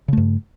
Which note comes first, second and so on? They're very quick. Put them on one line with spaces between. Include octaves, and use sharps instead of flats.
C#3 A3 G2